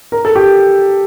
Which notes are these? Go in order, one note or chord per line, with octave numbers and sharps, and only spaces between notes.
A#4
A4
G4